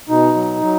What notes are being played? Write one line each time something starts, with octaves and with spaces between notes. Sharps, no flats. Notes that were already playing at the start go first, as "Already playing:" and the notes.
B2 D#4
F#3
F#3